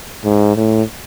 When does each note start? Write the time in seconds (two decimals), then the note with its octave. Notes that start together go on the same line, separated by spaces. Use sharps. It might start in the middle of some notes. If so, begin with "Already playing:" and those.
0.25 G#2
0.56 A2